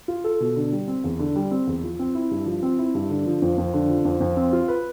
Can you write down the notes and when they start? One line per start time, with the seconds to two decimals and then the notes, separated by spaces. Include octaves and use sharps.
0.08 F4
0.24 A4
0.40 B2
0.56 D3
0.72 G3
0.88 C4
1.04 E2
1.19 D3
1.36 G3
1.51 C4
1.67 E2
1.82 F3
1.99 C4
2.15 E4
2.31 G2
2.46 F3
2.63 C4
2.78 E4
2.94 G2
3.10 D3
3.26 F3
3.42 F2
3.58 F2
3.73 D3
3.89 F3
4.05 F2
4.20 F2
4.37 C4
4.53 F4
4.68 B4